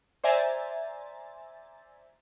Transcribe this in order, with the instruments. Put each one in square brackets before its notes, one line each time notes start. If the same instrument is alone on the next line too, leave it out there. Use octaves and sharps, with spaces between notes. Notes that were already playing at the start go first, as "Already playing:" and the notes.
[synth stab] C5 D5 E5 G#5 A#5 A6